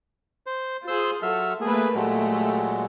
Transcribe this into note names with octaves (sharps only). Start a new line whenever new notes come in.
C5
F4 G#4 C5 C6 E6
F#3 A4 E5 F6
A3 A#3 G#4 B4
A#2 F#3 G#3 A3 G4